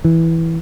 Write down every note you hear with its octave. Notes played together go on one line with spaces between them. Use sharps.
E3